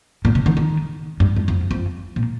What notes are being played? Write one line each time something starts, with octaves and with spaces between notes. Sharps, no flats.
A#2
C3
D#3
D#3
G2
G2
F2
F2
A#2